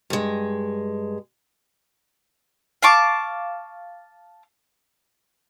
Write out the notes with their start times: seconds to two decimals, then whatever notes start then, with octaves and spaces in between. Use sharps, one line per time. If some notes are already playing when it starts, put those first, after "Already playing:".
0.10 G2 G#3
2.82 F5 A5 C#6 D6